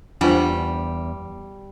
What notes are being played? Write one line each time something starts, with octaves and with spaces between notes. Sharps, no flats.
E2 G3 D4 F4 C5 F#5